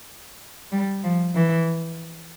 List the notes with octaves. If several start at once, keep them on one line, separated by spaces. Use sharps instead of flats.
G3
F3
E3